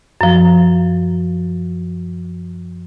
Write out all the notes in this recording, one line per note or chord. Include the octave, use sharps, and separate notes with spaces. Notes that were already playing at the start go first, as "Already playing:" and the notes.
F#2 F3